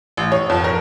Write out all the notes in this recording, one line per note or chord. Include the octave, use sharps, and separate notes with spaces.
A1
C#5
F2
A#4